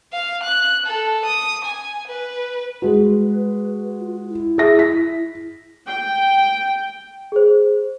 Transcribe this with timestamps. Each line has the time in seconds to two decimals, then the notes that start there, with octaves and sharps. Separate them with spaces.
0.13 F5
0.43 F#6
0.86 A4
1.26 D#6
1.65 G#5
2.08 B4
2.82 G#3 F#4 B4
3.99 F4
4.29 E4
4.58 G#4 E5 A#6
4.79 B6
5.86 G5
7.32 G#4 C5